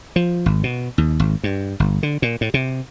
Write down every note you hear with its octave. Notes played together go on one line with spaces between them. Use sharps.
F3
G#1
B2
D#2
G#1
G2
G1
D3
A#2
A2
C3